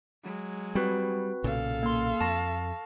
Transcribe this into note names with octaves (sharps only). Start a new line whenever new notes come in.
F#3 G#3
G3 C4 F#4 B4
B1 A#2 C#3 A4 F5
A#3 C6
F2 A5 C#6 A#6